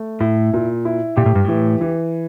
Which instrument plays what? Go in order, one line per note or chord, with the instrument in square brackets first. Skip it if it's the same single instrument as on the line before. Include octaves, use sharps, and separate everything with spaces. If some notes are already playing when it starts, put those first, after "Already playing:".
Already playing: [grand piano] A3
[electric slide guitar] A2 [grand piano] E4
[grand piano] A#2
E4
[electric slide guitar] A#2 [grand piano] G4
[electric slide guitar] A2
G2
[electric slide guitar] A2 [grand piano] E3
[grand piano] E3